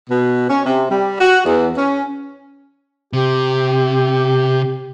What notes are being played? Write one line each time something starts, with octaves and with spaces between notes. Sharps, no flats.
B2
C#4
C3
G3
F#4
E2
C#4
C3 G4